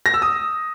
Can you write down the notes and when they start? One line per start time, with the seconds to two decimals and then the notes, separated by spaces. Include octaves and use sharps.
0.06 A#6
0.14 E6
0.22 D#6